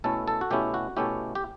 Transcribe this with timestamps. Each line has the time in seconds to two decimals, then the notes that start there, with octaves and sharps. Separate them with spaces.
0.04 B2 A3 C#4 E4 A4
0.28 A4
0.41 F#4
0.51 B2 A3 C#4 E4 G4
0.74 F#4
0.97 B2 A3 C#4 E4 G4
1.35 G4